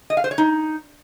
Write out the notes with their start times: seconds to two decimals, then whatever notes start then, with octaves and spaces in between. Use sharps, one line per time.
0.10 D#5
0.17 F5
0.24 C5
0.31 C#5
0.38 D#4